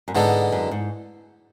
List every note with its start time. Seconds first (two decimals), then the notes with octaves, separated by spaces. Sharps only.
0.08 F#2
0.15 G#2 D3 G#3 B3 D4 A4
0.52 F#2
0.71 G#2